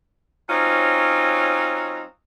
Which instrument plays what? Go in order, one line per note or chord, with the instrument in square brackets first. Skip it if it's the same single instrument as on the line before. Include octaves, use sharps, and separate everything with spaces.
[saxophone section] F#3 C4 C#4 D#4 F4